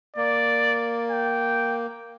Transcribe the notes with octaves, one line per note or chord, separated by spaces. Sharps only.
A#3 D5
G5